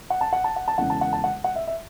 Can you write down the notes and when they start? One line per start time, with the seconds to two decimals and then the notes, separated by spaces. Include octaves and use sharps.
0.10 F#5
0.21 A5
0.33 F#5
0.44 A5
0.56 F#5
0.68 A5
0.78 E1 E2 C#3 E3 F#5
0.90 A5
1.01 F#5
1.13 A5
1.24 F#5
1.44 F#5
1.56 E5
1.67 E5